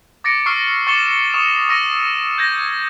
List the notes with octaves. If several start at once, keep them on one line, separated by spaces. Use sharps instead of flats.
D6 A6 A#6 C#7 D7
C#6 E6 F6 C7 C#7
C#6 D6 A6 C#7 E7 G7
C#6 D#6 E7
C#6 E6 A#6 D#7
G6 G#6 A#6